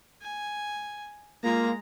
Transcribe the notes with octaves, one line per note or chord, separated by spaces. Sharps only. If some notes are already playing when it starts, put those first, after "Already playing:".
G#5
G#3 A#3 F4 A#5